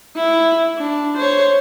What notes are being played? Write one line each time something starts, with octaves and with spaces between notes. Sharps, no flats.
E4
D4
C5 C#5